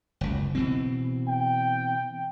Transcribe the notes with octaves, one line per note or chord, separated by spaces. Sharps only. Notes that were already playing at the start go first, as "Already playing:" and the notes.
F#1 C#2
B2 E3 C4
G5